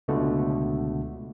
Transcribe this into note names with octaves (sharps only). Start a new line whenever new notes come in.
C#2 B2 D3 A3